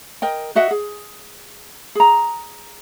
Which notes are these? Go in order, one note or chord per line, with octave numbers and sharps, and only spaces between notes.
A#4 D#5 G5
F#4 D#5 E5 F#5
G#4
G#4 A#5